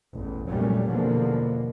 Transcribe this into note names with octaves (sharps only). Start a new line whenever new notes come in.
A1 E2
F1 A#2 F#3 G3 A3 C#4
E2 B2 D3 F3 A#3